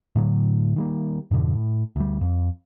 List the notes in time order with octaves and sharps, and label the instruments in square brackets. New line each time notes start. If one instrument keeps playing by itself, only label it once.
[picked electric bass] A2 D3 F#3
D#3 G3 A#3
F2 G#2 B2 D3
A2
D2 G3
F2